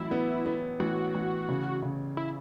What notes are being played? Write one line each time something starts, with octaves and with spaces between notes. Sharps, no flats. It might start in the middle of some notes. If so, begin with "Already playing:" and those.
Already playing: A1 F#3 E4
B3
B3
A1 F#4
A1
C#3
C#3
E4